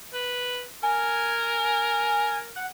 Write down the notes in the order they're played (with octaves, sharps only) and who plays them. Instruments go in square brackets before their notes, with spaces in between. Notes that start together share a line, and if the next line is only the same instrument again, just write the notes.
[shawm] B4
[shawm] A#4 [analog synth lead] G#5
[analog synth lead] F#5